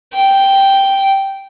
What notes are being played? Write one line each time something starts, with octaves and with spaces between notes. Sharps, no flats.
G5